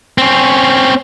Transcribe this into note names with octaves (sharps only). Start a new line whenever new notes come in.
C4 C#4